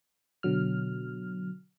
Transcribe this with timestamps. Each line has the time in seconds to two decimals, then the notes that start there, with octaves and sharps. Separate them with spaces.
0.43 B2 D3 F#3 F6